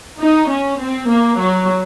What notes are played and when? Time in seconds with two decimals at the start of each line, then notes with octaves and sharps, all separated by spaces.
0.20 D#4
0.50 C#4
0.79 C4
1.09 A#3
1.38 F#3